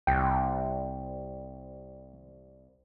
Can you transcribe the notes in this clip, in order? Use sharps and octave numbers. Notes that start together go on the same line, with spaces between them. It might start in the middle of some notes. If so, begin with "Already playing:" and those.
C2 G5